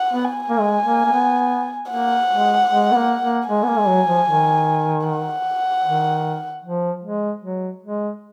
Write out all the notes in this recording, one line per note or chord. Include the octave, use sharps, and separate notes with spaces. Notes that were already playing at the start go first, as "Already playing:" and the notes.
Already playing: F#5
B3
G#5
A#3
G#3
A#3
A#3
B3
A#3 F#5
G#3
G#3
B3
A#3
A#3
G#3 G#5
B3
A#3
G#3
F#3
F3
D#3
F#5
D#3
F3
G#3
F#3
G#3